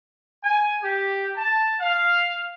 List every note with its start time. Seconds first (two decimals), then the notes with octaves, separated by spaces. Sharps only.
0.44 G#5
0.82 G4
1.36 A5
1.80 F5